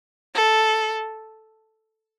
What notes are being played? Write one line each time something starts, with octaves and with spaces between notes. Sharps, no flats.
A4